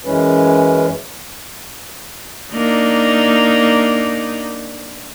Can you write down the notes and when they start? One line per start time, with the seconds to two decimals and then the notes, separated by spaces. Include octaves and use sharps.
0.05 F#2 E3 G#3 C#4 B4
2.52 A#3 D4 D#4